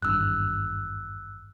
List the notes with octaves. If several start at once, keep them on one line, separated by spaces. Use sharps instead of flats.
G#1 E2 G2 E6 F#6